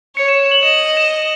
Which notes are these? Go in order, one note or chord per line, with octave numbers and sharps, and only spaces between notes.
C#5 C#7
E7
E7
F#7
D#5 E7
F#7
F#7
E7
E7